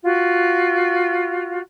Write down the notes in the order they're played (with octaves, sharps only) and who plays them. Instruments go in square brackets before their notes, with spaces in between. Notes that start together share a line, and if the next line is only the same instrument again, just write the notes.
[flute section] F4 F#4